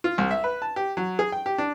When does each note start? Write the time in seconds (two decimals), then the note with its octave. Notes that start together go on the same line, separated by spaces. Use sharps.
0.04 F4
0.18 C2
0.31 E5
0.44 B4
0.62 A5
0.76 G4
0.97 F#3
1.19 G#4
1.32 G5
1.46 G4
1.58 D4